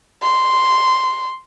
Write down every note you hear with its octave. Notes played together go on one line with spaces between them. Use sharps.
C6